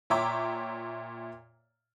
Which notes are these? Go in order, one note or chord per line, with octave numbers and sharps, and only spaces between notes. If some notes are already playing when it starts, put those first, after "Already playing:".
A#2 C#5 E5 G5 A#5 D6